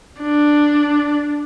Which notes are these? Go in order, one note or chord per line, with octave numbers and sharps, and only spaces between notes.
D4